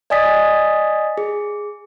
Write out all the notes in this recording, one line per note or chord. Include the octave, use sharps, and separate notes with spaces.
D5 D#5 G#5 D#6 A6 B6
G#4